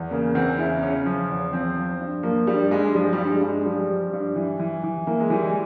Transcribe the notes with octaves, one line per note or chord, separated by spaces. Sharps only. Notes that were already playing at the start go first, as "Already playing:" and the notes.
Already playing: E2
C#3 A#3
E2 C4
C#3 E4
C#3 C#4
F3
E2
F3 C4
F3
G2
F3 A#3
G2 G3
G2 G#3
F3 G3
G3
G2
G#3
G2
G#3
F3 G3
F3
G2
E3
E3
E3
E3 A#3
G#3
E3 G3
G#3